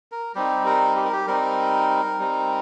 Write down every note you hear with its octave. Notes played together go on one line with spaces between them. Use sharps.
A#4
G3 C4 D#4 G4
A#4
G4
A#4
G4
G3 C4 D#4 A#4
G3 C4 D#4